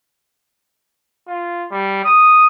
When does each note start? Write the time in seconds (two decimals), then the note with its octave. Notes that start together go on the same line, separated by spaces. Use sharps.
1.28 F4
1.71 G3
2.04 D#6